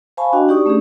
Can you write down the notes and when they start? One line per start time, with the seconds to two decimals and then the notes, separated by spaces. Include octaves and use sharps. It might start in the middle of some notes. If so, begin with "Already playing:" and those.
0.17 C5 F5 G#5 A5 B5 C#6
0.33 D4 F#4 D#5 G5
0.48 D#4 G4 D5 C#6 D#6
0.66 A3 C#4 D4 G#4